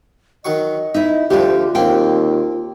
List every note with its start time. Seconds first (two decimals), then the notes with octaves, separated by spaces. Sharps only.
0.45 D#3 F#3 D#5 C#6
0.94 D#4 E4 E5
1.30 D2 D3 F3 G3 F4 G4
1.75 D#2 A#3 C4 G5